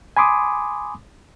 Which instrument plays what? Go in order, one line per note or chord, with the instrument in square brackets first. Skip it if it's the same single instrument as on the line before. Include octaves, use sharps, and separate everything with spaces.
[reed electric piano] G#5 B5 C6 D6 D#6